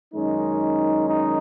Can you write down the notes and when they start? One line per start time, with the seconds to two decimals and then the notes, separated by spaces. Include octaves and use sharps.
0.14 F#2 D#3 G#3 C#4 D#4
1.09 D#4